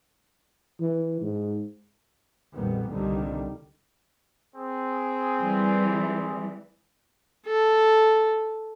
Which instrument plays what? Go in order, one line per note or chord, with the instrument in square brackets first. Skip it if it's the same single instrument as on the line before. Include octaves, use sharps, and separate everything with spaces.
[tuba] E3
G#2
[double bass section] A#1 F2 D#3 G3 B3
C2 A#2 D3 D#3 G3
[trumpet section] C4 G#4
[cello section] E3 G3
[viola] A4